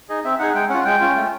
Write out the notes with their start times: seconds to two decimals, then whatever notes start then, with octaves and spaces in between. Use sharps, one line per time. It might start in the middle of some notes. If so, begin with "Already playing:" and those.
0.09 D#4 G#4 D#5
0.24 C4 E5
0.39 D#4 G#4 F#5
0.55 G#3 G5
0.69 C#4 F4 F#5
0.85 G#3 G5
1.01 C#4 F4
1.16 A3